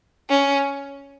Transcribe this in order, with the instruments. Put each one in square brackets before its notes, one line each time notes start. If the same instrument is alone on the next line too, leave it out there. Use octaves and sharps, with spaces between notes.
[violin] C#4